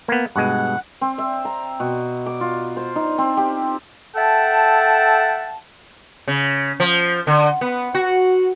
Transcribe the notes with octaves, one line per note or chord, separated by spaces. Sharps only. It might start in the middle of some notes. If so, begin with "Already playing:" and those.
A#3 B3
G2 B2 G#3 F#5
C4
E5
A#5
B2
D6
F4
C5
D#4
C4
G4
A4 E5 F#5 G5 A5
C#3
F3
D3
B3
F#4